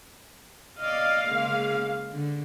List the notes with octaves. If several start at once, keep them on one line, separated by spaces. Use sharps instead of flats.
D5 D#5 F5
C#3 G#3 A#3
D3